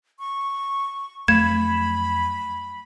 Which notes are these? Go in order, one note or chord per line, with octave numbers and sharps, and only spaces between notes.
C#6
F2 F#3 A3 B5 G#6 E7